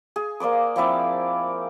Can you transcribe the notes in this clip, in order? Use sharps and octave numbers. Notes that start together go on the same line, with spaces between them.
G#4
A#3 C5 D5 D#6
F3 C4 E4 D5